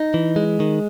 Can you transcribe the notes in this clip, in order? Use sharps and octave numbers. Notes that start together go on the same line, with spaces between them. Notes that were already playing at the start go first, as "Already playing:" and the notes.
Already playing: D#4
E3
G#3
D#3